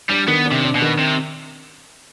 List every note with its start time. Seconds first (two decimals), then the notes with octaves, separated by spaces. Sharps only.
0.10 G3 D4
0.28 D#3 B3
0.45 D4
0.51 C3
0.64 D4
0.75 B2
0.82 D#3
0.99 C3